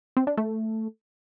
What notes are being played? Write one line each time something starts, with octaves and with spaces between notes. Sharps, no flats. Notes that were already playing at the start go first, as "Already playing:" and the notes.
C4
D4
A3